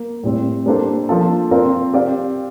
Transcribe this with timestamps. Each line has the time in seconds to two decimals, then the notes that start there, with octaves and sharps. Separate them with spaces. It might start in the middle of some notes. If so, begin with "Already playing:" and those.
Already playing: A#3
0.24 A2 G3 C4
0.66 G3 A#3 D4 A4 C5
1.09 F3 A#3 D4 F4 A4
1.51 C4 F4 A#4 D5 F5
1.94 C4 G4 D5 F5